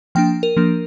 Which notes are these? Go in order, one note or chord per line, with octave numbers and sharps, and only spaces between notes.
F3 A#3 D4 G5
A#4
F3 A#3 D4